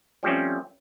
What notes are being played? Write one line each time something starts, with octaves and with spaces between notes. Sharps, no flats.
F3 G3 A3 C4 C#4